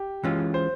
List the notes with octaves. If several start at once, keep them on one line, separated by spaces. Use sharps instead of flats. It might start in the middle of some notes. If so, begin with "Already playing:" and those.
Already playing: G4
E3 G#3 C#4 F4
C5